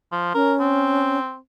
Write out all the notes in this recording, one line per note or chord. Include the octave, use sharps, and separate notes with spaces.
F3
C#4 A#4
C4